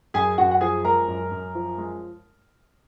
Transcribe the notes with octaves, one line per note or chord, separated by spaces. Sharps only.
F#2 G#4 G#5
F#2 F#4 F#5
F#5
F3 G#4 G#5
G#3 A#4 A#5
F#2
F#2
F3
G#3